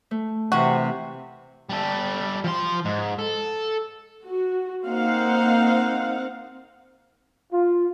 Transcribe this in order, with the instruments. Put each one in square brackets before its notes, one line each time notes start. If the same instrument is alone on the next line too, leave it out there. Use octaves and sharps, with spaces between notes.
[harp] A3
[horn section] C3 [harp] E3 [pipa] F#4
[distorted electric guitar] G3 A4
F3 C6
G#2
A4
[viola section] F#4
A#3 C4 D#4 F5 F#5
[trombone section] F4